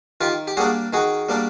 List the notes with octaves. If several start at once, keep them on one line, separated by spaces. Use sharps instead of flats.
D#3 F4 G4
G4
G3 A#3 D4 F#4 G#4
D#3 F#4 G#4
G3 A#3 D4